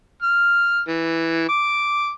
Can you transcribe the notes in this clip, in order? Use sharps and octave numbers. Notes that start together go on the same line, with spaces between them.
F6
E3
D6